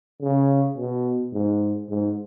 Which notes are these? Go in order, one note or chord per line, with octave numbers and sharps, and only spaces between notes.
C#3
B2
G#2
G#2